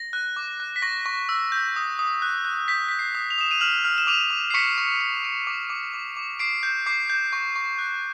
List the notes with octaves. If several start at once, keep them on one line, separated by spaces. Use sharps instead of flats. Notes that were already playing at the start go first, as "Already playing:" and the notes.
Already playing: A#6
F#6
D6
F#6
B6
C#6 A#6
C#6
E6
G6
D#6
D#6
F#6
F#6
G6 B6
G6 B6
C7
D#6
F7
D#6 E7
D#7 F7
F6 E7 F#7
F6
E7
D6 D#7 F7
D6
C7
C#6 B6 C#7
C#6
C#6
C#6
D6
D6
D6
D6
D6 C7 D7
G6
D6 C7
G6
C#6
C#6
F#6